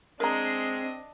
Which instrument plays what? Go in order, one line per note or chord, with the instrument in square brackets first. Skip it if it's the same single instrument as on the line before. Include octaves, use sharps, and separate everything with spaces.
[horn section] G#3 [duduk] C4 [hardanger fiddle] D4 D#5 [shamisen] A#4 A#5